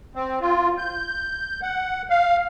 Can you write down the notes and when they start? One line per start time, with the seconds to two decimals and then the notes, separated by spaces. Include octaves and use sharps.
0.15 C4
0.41 F4
0.78 G6
1.62 F#5
2.10 F5